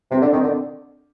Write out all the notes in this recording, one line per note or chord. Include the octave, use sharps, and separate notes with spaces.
C3 C4
D3 D4
D#3 C4
D3 D4